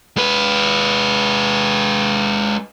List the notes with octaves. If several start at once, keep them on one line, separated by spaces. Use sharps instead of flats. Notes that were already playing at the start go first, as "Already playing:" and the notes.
G#3 B4